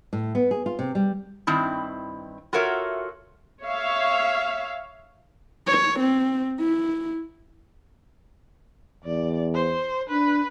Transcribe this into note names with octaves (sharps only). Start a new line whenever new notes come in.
A2
B3
G#4
F4
C3
G3
G2 D#3 C4 E4
F4 F#4 A4 A#4 C#5 E5
C#5 E5 F5
C#5
C4
E4
E2 D5
C5
D4 B4